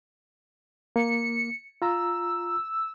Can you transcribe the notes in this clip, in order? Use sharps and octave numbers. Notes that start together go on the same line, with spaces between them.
A#3 C#7
F4 A#5 E6